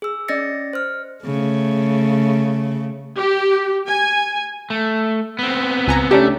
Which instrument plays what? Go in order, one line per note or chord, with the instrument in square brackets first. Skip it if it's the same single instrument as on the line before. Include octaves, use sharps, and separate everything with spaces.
[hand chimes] G#4 E6
C#4 D5 D#5 A6 A#6 C#7
C5 F6
[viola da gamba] C#3 A3
[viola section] G4
G#5
[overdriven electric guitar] A3
B3 C4
[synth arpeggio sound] C#2 G#5 A#5
[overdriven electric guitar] A3 [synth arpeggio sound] C#4 D4 G4